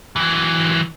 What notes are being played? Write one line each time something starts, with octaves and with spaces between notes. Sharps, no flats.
E3 F#3